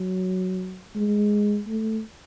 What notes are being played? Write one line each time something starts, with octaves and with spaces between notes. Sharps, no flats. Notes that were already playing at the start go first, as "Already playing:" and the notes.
Already playing: F#3
G#3
A3